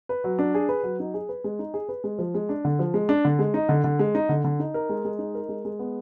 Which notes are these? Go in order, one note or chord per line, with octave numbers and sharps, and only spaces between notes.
B4
F#3
D4
G#4
B4
F#3
D#4
G#4
B4
G#3
D#4
G#4
B4
G#3
F3
G#3
D4
D3
F3
G#3
D4
D3
G#3
D#4
D3
D3
G#3
D#4
D3
D3
D#4
A#4
G#3
G#3
D#4
A#4
G#3
G#3
B3